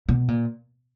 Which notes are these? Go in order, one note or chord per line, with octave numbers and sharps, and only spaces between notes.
B2
A#2